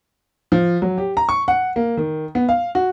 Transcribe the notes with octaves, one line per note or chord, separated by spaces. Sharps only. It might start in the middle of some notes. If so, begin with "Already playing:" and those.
F3
F#3
G4
A#5
C#6
F#5
A#3
D#3
B3
F5
F#4